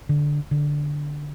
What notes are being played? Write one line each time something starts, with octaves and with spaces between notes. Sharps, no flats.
D3
D3